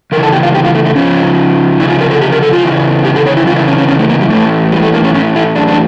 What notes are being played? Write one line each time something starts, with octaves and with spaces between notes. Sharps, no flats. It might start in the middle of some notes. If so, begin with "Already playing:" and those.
C#3 E3 A#4
A4
G4
F4
G4
F4
A3
A3
C#3 F3 C#4
C#3 F3 E4
F4
A#4
A4
G4
A#4
A4
F4
C#3 E3
G4
A4
C#5
E4
C#3 E3 F4
E4
C#4
C#4
C#4
A3
A#3
G3
A2 E3 A3
G3
A3
A#3
C#4
A2 E3 C#4
E4
D4
D4